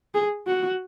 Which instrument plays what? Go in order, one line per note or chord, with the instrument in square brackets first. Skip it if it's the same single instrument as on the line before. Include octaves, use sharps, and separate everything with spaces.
[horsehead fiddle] G#4
F#4